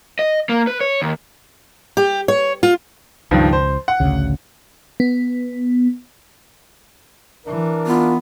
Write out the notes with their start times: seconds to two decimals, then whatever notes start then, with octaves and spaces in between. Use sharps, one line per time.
0.19 D#5
0.49 A#3
0.67 B4
0.81 C#5
1.02 D#2
1.97 G4
2.28 C#5
2.63 F4
3.31 C#2 G2 D#3 F3
3.53 C5
3.88 F#5
4.00 A1 D2 C#3
5.00 B3
7.47 E3 D4 A#4
7.87 B3 F4